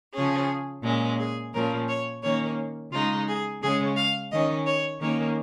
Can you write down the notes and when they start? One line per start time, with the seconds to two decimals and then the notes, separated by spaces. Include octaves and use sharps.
0.14 C#3 F3 C#4 G#4
0.84 A#2 G#3 C#4
1.19 G#4
1.54 A#2 F3 C#4 A#4
1.88 C#5
2.23 D#3 A#3 C#4 C#5
2.92 C#3 G#3 D#4 F4
3.27 G#4
3.62 C#3 G#3 C#4 G#4
3.97 F5
4.31 D#3 C#4 D#5
4.66 C#5
5.01 D#3 A#3 C#4 C#5